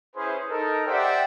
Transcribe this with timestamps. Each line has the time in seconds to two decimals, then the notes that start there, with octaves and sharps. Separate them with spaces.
0.16 C#4 E4 G#4 B4 C5
0.50 D#4 A4 A#4
0.87 G4 C5 D5 E5 F#5 G5